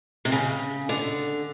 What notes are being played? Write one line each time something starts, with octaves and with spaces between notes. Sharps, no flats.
C3
C#3
D3